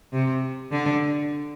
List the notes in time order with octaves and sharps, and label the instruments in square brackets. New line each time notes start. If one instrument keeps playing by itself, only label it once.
[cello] C3
D3